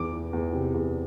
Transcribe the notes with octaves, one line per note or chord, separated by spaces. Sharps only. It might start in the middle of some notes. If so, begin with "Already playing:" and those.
Already playing: E2 D6
E3
E2
C3
E2